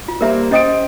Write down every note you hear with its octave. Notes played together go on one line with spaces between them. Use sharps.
F4
G3 A#3 A#4 C5 E5 A#5
C#4 C5 D#5 G5 D#6 D7